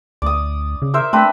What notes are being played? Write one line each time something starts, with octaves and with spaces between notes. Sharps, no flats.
D2 D5 D#6
C#3
A#4 C5 E5
A3 C4 D4 B4